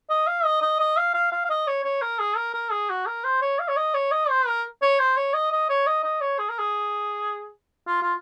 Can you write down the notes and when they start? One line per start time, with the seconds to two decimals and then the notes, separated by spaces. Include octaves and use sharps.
0.10 D#5
0.27 F5
0.44 D#5
0.62 D#5
0.80 D#5
0.97 F5
1.14 F5
1.32 F5
1.45 F5
1.50 D#5
1.67 C#5
1.84 C#5
2.02 A#4
2.19 G#4
2.36 A#4
2.54 A#4
2.71 G#4
2.90 F#4
3.07 A#4
3.24 C5
3.42 C#5
3.59 F5
3.68 C#5
3.77 D#5
3.94 C#5
4.12 D#5
4.29 C5
4.47 A#4
4.82 C#5
5.00 C5
5.17 C#5
5.34 D#5
5.52 D#5
5.69 C#5
5.87 D#5
6.04 D#5
6.21 C#5
6.39 G#4
6.49 A#4
6.59 G#4
7.87 F4
8.02 F4